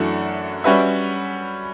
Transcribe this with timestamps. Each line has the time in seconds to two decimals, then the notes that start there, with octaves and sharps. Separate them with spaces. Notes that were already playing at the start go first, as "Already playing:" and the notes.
Already playing: F#2 E3 A3 D4 F#4
0.64 G3 C#4 F#4 B4 E5